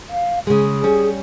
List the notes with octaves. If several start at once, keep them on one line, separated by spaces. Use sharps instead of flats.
F5
C#3 G#3 G#4
G3 C#4